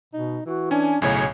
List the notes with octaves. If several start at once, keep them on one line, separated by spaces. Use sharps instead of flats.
B2 D#4
E3 F#4
C#4 D4 G#5
B1 A2 C#3 C#5 G#5